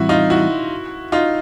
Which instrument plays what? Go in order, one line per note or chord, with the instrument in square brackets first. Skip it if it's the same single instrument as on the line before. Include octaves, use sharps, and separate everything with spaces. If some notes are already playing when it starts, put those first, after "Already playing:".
Already playing: [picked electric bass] A2 E3 G3 C4 [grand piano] E4 F#4
[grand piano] D#4 F4
E4 F#4
D#4 F4